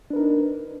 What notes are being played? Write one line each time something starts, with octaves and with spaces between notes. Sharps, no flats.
D4 D#4 A#4 B4